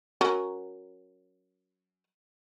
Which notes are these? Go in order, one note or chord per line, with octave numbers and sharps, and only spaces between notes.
F#3 C#4 A#4